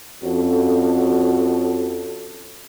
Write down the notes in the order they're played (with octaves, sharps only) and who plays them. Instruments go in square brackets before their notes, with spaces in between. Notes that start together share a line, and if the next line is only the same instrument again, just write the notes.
[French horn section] F2 C#4 F#4 A4 C#5